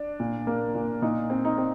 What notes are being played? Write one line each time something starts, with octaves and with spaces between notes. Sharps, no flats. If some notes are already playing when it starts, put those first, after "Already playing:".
Already playing: D4
A#2
A#3
A#2
A#2 D#4
C4
D#4
C4